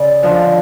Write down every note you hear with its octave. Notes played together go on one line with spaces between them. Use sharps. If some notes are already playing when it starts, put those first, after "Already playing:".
Already playing: C#3 D5
F2 D3 F3